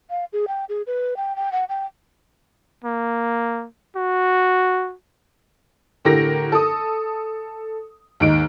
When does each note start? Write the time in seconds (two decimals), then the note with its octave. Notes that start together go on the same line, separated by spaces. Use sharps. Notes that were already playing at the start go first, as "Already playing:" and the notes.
0.10 F5
0.33 G#4
0.48 G5
0.69 G#4
0.87 B4
1.17 G5
1.36 G5
1.52 F#5
1.69 G5
2.84 A#3
3.96 F#4
6.05 A2 D3 G4 A#4 A#6
6.52 A4 D#6
8.20 D#2 G#2 D#4 D7